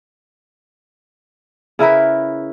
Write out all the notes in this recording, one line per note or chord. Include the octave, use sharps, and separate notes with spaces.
C#3 E4 A#4 B4